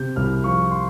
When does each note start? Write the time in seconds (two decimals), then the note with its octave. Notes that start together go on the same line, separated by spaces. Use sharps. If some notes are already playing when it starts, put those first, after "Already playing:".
Already playing: C3 G6
0.16 C2 F6
0.44 F3 C#6
0.71 C6